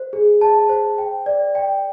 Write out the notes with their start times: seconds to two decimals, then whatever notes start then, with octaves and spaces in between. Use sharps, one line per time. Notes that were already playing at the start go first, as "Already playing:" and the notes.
Already playing: C5
0.13 G#4
0.41 A5
0.69 C5
0.98 G5
1.26 D5
1.55 G5